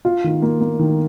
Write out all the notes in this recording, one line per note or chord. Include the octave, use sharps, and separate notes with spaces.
F4
D#3
A#3
A#3
D#3